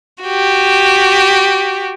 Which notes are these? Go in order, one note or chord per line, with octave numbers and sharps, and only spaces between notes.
F#4 G4